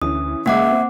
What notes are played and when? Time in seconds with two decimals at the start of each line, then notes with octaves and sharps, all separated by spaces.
0.02 D2 E3 C#4 D#6
0.46 C#2 G#3 A#3 C#4 E5 F#5 D6
0.70 C4